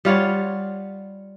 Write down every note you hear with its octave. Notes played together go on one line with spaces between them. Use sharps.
G3 F4 C#5 F#5